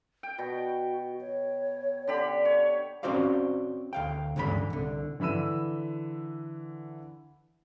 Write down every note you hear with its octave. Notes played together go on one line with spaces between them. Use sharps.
G5
B2 F#4
C#5
D3 G4 B5
C#5
C4 C#4 F#4 C5 D5 F5
D2 F5 G5
C#2 G2 D3 E3 A4 B5
C2 D3
D3 E3 B5 E6 D#7